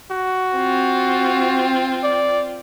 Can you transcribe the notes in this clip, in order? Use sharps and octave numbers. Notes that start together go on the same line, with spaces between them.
F#4
C4 F4
D5